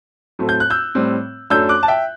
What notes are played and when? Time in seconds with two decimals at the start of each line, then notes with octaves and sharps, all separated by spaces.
0.39 A2 F#3 A3 C4
0.49 G6
0.60 F#6
0.70 E6 G6
0.95 A2 G3 C4
1.50 F#2 F#3 A3 D4 E6 G6
1.69 D6 F#6
1.83 A5
1.88 E5 G5